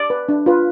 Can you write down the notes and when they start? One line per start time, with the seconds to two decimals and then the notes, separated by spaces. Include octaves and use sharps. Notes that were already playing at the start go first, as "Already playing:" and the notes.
Already playing: D5
0.10 B4
0.29 D4
0.46 F4 B4